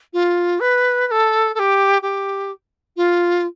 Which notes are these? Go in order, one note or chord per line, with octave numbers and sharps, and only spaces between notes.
F4
B4
B4
A4
A4
G4
G4
F4